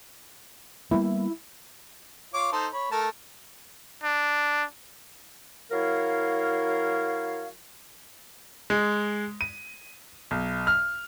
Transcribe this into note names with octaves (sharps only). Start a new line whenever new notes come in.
G3 A#3 B3 E4
F4 C#5 D6
D#4 A4 C5
C#5 B5
A3 A#4 A5
D4
F#3 E4 A#4 C#5 F5
G#3
D#7
B1
F6